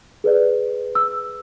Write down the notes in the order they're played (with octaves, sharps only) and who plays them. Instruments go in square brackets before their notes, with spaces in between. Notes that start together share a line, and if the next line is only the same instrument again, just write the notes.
[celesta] G#4 B4 D5
E6